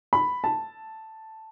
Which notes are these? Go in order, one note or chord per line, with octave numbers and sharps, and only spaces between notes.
B5
A5